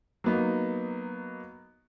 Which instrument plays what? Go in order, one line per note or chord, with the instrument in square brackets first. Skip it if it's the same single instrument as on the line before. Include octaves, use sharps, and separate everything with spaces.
[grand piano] F#3 A#3 B3 D#4